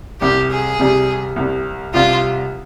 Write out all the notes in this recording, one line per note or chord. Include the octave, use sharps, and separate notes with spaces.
C2 C3 G3 G4
G#4
C2 C3 G3
C2 C3 G3
C2 C3 G3 F4